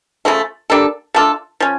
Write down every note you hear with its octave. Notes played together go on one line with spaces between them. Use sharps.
C#3 F3 A3
G3 A#3 D4 A4
A3 D4 F4 A4
F3 C#4